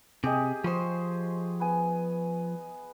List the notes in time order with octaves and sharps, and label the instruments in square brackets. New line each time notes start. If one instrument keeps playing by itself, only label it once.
[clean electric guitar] C3 [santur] G4 G#4 D#5
[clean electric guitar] F3 C5 [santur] C6 C#6
[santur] B3 G#5